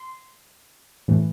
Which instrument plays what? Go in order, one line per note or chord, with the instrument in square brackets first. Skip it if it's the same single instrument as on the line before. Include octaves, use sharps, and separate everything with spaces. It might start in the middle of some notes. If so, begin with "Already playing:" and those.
Already playing: [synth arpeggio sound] C6
A2 E3